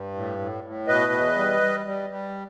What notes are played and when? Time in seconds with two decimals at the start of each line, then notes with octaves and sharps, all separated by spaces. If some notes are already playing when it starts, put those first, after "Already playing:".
Already playing: G2
0.14 A2
0.39 A2
0.64 A2
0.87 B2 B4 D#5
1.12 E2
1.36 G3
1.61 G3
1.86 G3
2.10 G3